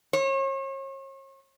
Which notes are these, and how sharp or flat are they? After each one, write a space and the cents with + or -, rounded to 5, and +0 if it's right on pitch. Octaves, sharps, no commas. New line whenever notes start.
C#5 -40